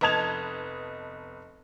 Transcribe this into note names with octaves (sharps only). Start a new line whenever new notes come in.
F1 B3 D#5 A5 G#6 F7